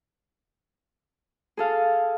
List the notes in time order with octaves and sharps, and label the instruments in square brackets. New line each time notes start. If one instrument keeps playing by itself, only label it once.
[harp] G#4 A4 F5